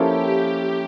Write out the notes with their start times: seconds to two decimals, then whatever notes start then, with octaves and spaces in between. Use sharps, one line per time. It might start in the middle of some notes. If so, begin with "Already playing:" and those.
Already playing: F3 A#3 C#4 E4 G4 A4
0.49 G4